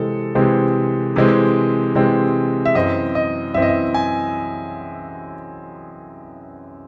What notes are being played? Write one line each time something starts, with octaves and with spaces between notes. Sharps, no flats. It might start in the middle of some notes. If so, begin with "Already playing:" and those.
Already playing: C3 E3 G#3 C4 A4
C3 E3 G#3 C4
C3 E3 G#3 C4
C3 E3 G#3 C4
E5
F#2 E3 C4 D#5
D#5
F#2 E3 C4 E5
D#5
E5
G#5